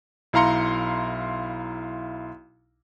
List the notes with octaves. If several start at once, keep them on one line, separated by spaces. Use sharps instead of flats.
B1 E4 F5 A#5 C6 C#7